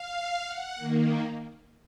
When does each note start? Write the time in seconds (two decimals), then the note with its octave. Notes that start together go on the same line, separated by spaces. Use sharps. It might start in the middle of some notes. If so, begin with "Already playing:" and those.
Already playing: F5
0.45 F#5
0.76 D#3 A#3